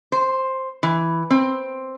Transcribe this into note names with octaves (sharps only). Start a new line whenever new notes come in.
C5
E3
C4